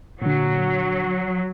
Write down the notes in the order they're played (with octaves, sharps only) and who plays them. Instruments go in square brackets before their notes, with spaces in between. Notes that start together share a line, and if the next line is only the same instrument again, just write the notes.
[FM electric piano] A#2 D3 [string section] F#3